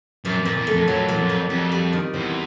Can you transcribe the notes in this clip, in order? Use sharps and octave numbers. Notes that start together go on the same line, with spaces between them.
F#2 A#2
F2
A#2
E2
F2 A3
F2 F#3
E2 A#2
F2
A#2
F2 G3
G3
D#3
E2 C4